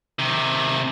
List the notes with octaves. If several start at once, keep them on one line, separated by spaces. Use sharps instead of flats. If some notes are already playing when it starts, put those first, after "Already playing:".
C3 D#3